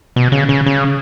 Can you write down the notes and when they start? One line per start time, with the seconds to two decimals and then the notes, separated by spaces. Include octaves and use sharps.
0.16 B2
0.32 C#3
0.49 C#3
0.66 C#3